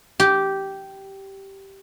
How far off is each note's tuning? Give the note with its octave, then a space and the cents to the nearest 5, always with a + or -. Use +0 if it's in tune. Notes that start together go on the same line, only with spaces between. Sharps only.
G4 -10